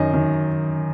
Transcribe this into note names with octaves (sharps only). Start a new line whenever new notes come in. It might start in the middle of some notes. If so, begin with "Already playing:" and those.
Already playing: F#2 D#3 D#5
F#2 D#3